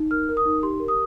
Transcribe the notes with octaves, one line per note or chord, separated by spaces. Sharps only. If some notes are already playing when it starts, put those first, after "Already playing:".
Already playing: D#4
A#4 F6
A#4
D#6
D#4
G4 C6
A#4
D#6